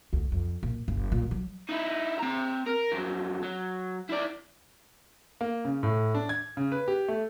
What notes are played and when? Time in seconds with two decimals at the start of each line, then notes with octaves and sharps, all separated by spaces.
0.13 D2
0.32 F2
0.63 A#2
0.88 F#1
1.12 A#2
1.31 F#3
1.69 D#4 E4
2.19 C4 A#5
2.66 A#4
2.92 F2 F#3
3.43 F#3
4.09 E4 D5
5.41 A#3
5.65 C#3
5.83 A2
6.15 D4
6.29 G#6
6.57 C#3
6.72 B4
6.88 G4
7.08 A3